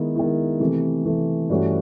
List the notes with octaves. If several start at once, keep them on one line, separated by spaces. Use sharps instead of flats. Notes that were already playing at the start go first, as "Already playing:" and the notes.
Already playing: D#3 G#3 B3 E4
D#3 G#3 B3 E4
C3 E3 A3
C3 E3 A3
G2 E3 A3 C#4 F#4